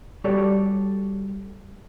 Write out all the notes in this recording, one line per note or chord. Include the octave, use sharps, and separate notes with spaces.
G3 F#4 G4 A4 C#5 D5